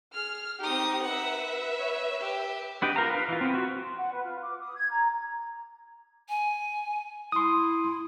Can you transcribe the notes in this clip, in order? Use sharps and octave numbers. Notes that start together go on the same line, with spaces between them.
G#4 F6
C4 D#4 G4 D#6
B4 E5 F#5
C#5
G4
B3 D4 G4 D5 D#5
F4 A#4 F5 A#5
B4 F5
E3 F4
B3 C4
F#4
C6
F#5
B4
F4
D6
D#6
G#6
A#5
G#5
E4 C6 D#6